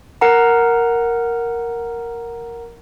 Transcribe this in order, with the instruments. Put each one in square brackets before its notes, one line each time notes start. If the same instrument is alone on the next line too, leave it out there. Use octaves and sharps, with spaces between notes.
[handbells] A#4 F#5 A#5